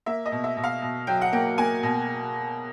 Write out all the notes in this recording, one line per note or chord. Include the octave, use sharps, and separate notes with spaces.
A#3 E5
D#5
B2
E5
B2
F5
B2
F#3 G5
F#5
A#3 G5
A#3 G#5
B2